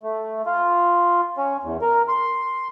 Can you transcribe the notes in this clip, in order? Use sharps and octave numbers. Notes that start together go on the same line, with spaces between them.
A3
F4
C#4
E2
A#4
C6